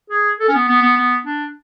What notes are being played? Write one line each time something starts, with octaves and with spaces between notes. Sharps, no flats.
G#4
A4
C#4
B3
B3
B3
B3
D4